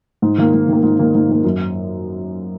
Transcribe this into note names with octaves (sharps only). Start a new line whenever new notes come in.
G#2
D#3 A#3
G#2
D#3 A#3
G#2
D#3 A#3
G#2
D#3 A#3
F#2